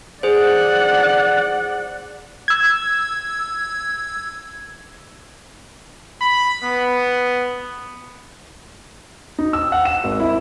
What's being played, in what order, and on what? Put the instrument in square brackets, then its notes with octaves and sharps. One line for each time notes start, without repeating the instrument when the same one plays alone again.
[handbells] G#4 C5 [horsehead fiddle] D5 F#5
[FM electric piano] E6 G#6
[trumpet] B5
B3
[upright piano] D#4
E6
F#5
E7
G#1
E4